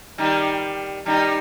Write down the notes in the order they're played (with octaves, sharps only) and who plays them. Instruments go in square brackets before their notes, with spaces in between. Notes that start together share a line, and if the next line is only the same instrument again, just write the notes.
[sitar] D#3 G3 [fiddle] D#4
[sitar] D#3 G3 [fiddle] D#4